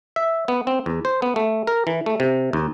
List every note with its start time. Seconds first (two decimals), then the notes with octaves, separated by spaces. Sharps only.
0.16 E5
0.48 B3
0.67 C4
0.86 E2
1.05 C5
1.22 B3
1.36 A3
1.67 A#4
1.87 E3
2.06 A3
2.20 C3
2.53 D#2